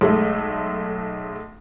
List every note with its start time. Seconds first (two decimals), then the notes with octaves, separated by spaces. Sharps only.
0.01 B1 G#3 A3